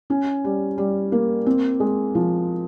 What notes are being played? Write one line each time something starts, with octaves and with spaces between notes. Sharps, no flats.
C#4
G3
G3
A#3
C4
G#3
F3